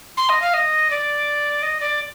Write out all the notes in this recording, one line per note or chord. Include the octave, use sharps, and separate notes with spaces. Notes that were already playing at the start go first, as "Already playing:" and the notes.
C6
D#5
F5
D#5
D5
D#5
D5